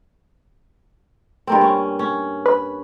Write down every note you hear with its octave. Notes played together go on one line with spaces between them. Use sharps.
G2 A#3 C4
C#4
C#4
B4